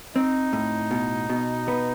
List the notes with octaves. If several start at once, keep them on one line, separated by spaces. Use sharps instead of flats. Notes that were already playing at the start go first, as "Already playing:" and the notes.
C4 D#4
A2
B2
B2
B3